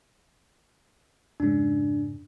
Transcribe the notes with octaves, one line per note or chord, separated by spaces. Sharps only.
F2 G#2 C#3 D4